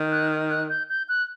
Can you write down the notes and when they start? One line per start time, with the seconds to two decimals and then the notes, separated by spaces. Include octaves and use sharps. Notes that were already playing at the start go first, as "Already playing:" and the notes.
Already playing: D#3
0.12 F#6
0.50 F#6
0.70 G6
0.89 G6
1.09 F#6